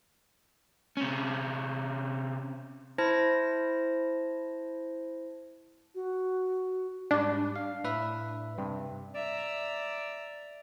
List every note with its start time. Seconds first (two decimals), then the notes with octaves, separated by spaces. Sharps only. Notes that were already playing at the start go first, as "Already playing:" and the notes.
0.97 C3 C#4
2.98 E4 C5 A5 G#6 A#6
5.95 F#4
7.11 G#2 G3 D4
7.56 F5
7.84 A2 B4 E5
8.58 G2 C3
9.15 D5 E5 A#5